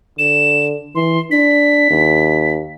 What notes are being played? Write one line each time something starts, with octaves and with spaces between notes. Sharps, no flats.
D3 E7
E3 C6
D4 B6
D#2